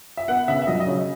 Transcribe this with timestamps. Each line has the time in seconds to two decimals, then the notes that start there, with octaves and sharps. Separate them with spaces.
0.17 E5
0.28 B3 F#5
0.48 C#3 E5
0.62 E5
0.67 F#3 D#5
0.80 D#5
0.87 C#3 C#5